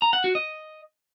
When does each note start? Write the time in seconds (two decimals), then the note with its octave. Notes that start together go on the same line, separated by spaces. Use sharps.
0.02 A#5
0.13 F#5
0.24 F#4
0.35 D#5